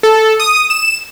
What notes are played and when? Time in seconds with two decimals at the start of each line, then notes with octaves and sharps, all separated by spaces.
0.03 A4
0.40 D#6
0.70 E7